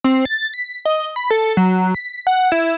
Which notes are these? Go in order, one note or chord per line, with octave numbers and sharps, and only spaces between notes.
C4
A6
B6
D#5
B5
A4
F#3
B6
F#5
E4